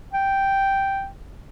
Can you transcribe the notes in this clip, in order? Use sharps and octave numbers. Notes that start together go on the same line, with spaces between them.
G5